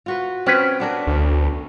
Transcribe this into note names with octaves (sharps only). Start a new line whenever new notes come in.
F4 F#4 B4
C4 C#4 B4
B3 D4 A#4
D2